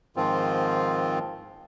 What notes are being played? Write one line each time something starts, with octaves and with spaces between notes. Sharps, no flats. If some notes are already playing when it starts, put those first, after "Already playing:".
G#2 D#3 F3 C4 F4